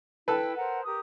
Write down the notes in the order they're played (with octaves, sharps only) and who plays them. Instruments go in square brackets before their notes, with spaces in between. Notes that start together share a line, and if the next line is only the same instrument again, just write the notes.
[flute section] E4 G5 [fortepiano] A4 B4
[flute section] A#4 C5 F#5
G4 A#4 D#6